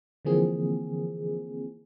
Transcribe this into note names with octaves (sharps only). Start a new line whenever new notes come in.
D3 E3 F3 A#3 C4 G#4